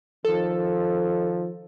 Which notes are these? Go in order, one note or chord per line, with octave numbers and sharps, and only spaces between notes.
D#3 F3 A4